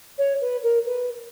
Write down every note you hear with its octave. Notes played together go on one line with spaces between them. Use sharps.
C#5
B4
A#4
B4